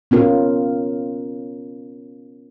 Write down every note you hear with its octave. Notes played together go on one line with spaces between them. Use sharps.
B3 C#4 F4 A#4